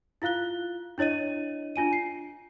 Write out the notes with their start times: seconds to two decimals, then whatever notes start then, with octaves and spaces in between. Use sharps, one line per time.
0.22 E4 F4 F5 F#6 G7
0.98 D4 E4 C#5 D#5 D#7
1.76 D4 F4 G#5 D#7
1.93 C7